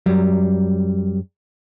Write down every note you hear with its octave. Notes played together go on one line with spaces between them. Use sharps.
F#2 F#3 G3